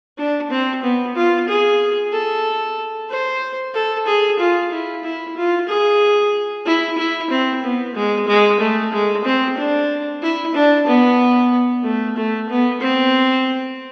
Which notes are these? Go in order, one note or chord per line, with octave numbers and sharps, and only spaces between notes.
D4
C4
B3
F4
G#4
A4
C5
A4
G#4
F4
E4
E4
F4
G#4
E4
E4
C4
B3
G#3
G#3
A3
G#3
C4
D4
E4
D4
B3
A3
A3
B3
C4